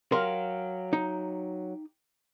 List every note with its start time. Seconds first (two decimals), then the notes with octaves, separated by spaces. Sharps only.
0.12 F#3 G4 A#4 F5 C6
0.93 D#4